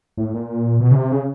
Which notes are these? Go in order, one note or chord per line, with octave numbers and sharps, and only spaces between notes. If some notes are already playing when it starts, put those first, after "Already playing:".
A2
A#2
B2
C#3
C3
C#3